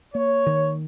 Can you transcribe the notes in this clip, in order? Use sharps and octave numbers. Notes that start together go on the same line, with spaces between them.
A#3 C#5
D#3